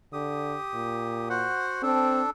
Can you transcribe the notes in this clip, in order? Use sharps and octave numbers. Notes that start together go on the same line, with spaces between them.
D3 G4 D#6
A#2
F#4 C5 F#5
C4 D4 A4